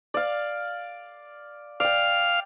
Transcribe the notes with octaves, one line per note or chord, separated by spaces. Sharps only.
D5 F5
D5 F5 G5